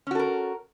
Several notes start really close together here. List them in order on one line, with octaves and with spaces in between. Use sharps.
C#4 F#4 A4 A#4